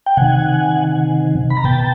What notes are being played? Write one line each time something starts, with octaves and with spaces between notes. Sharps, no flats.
G5
C3 D#3 F#5 G#5
B5
A#5
B2 G5 A5